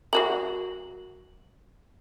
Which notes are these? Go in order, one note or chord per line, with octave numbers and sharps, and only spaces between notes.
F#3 F#4 A#4 F#7